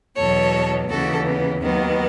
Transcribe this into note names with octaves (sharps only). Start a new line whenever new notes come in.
E2 B2 F#3 A4 C#5
D#2 C#3 E3 F#4 A4
B3
D#2 D#3 F#3 B3